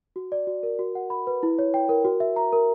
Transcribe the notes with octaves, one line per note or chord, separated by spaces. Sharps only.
F#4
D5
F#4
A#4
F#4
F#5
B5
B4
E4
C#5
G5
A#4
F#4
E5
A#5
A#4